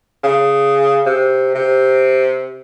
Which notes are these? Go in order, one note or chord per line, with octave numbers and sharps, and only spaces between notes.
C#3
C3
C3